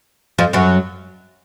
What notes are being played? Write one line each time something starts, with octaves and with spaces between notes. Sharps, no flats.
F2 F3
F#2 F#3